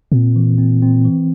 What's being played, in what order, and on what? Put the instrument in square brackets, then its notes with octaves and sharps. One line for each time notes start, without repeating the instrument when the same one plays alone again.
[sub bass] A#2 [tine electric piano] C4
[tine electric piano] E3
C4
C4
E3